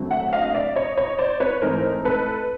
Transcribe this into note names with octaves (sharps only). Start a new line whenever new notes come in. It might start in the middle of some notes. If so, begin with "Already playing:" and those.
Already playing: D#2 D3 F#3 A3 C4
E5 F#5
D#5 F5
D5 E5
C#5 D#5
C#5 D#5
C5 D5
B4 C#5
G#2 E3 A3 C4 D#4 A#4 C5
A4 B4